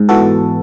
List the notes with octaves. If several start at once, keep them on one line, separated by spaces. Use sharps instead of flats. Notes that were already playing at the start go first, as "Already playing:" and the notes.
Already playing: G#2
E3 B3 F#4 A4